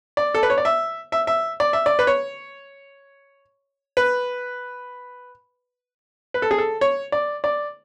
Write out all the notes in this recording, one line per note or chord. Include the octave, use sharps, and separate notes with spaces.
D5
A4
B4
C#5
D5
E5
E5
E5
D5
E5
D5
B4
C#5
B4
B4
A4
G#4
A4
C#5
D5
D5